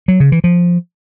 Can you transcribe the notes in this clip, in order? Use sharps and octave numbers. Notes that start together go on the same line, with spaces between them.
F#3
C#3
E3
F3